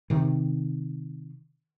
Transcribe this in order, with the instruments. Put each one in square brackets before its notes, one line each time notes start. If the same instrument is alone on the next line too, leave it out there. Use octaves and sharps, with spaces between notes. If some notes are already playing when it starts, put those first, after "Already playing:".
[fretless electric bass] C3 D#3